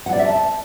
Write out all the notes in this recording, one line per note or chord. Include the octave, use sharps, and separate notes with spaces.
F#5
D5
E5
A5